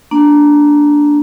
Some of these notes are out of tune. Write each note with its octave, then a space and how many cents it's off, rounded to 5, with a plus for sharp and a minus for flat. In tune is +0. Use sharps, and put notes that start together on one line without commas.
A#3 +0 D4 +0